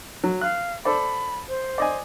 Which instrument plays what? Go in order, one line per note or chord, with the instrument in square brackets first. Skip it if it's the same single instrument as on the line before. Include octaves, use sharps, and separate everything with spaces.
[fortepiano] F#3
[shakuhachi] F5 [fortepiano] F#6
[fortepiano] A4 C5 D5 [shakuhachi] B5
[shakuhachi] C5
[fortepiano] D5 D#5 G#5